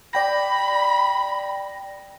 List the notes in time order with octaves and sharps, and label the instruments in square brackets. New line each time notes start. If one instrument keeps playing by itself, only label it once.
[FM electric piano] D5 G5 A#6 [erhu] B5